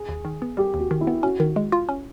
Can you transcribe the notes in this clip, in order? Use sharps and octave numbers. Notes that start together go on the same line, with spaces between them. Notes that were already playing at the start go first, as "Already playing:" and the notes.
Already playing: G#4
D#2
D#3
B3
G3 G4
D#2
F#4
D#3
E4
B3
C#4 F#4
D#3
G#3
F4
C#4